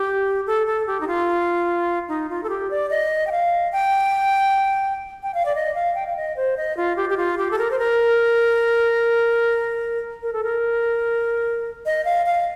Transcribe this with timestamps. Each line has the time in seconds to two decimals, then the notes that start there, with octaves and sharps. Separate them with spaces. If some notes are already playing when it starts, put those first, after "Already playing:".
Already playing: G4
0.47 A4
0.67 A4
0.87 G4
1.00 D#4
1.07 F4
2.08 D#4
2.30 F4
2.43 A4
2.49 G4
2.70 D5
2.90 D#5
3.27 G5
3.31 F5
3.72 G5
5.23 G5
5.34 F5
5.45 D5
5.55 D#5
5.75 F5
5.95 G5
6.06 F5
6.16 D#5
6.36 C5
6.57 D#5
6.77 F4
6.96 G4
7.10 G4
7.17 F4
7.38 G4
7.51 A4
7.58 A#4
7.71 C5
7.79 A#4
10.23 A#4
10.33 A4
10.43 A#4
11.86 D#5
12.05 F5
12.26 F5